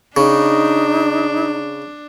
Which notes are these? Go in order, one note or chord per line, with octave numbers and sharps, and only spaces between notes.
C#3 D4 D#4